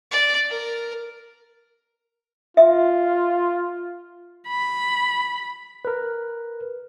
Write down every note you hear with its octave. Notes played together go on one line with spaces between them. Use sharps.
D5
A#4
F4 E5
B5
A#4 B4